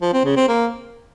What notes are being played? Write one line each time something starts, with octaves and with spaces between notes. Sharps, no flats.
F3
C4
C#3
C4
A#3